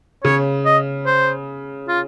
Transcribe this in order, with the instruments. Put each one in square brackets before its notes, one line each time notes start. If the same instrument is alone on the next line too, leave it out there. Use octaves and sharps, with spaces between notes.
[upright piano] C#3 [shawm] C#5
[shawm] D#5
C5
F4